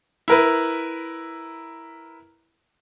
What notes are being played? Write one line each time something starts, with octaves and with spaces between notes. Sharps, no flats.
E4 A#4 B4